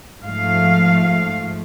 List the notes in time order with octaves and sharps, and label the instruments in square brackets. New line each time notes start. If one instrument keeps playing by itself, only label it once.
[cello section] G#2 F3 A3 F5